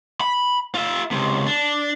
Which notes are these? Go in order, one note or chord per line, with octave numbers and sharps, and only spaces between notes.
B5
F4 E5
C#2 C3
D4